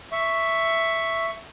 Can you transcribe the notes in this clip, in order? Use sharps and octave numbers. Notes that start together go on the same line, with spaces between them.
E5 C#6